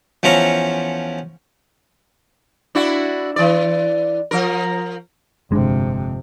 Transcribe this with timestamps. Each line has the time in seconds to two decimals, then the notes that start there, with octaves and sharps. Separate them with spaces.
0.23 E2 F3 C#4 E5 A#5 C#6
2.75 D4 E4 F#4
3.36 E3 D5
4.31 F3 A#4
5.51 G1 F2 C3 G#3 D4